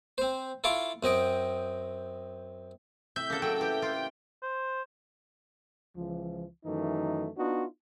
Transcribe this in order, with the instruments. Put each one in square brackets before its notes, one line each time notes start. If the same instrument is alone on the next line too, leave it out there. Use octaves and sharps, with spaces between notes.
[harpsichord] C4 C5
E4 F4 A4 F5 C#6 D6
F#2 C4 D#5 G5
[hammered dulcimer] A2 C3 [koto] E5 [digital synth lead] G6
[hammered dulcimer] C#3 F#5 [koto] A#3 A4
[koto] F#3 [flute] A4 [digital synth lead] G5
[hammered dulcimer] E3 [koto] G4
[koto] F4
[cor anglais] C5
[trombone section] C#2 E3 F3
F#2 D#3 E3 A3 D#4
B3 D4 D#4 F4 F#4